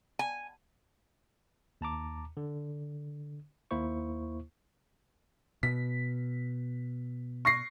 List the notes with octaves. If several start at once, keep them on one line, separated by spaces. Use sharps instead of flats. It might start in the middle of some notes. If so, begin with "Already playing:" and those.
G#5
D#2 A5 A#5 D6
D3
D#2 A#3 E4 C5 C#6
B2 B6
C#6 A#6 C7